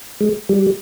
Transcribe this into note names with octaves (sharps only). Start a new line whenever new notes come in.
G#3
G3